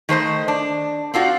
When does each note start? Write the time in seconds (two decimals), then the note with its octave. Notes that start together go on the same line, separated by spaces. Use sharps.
0.09 D#3 A3 C5 D#5
0.48 D4
1.14 C4 D4 F4 F#4